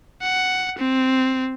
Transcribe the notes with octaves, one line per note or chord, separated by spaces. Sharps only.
F#5
C4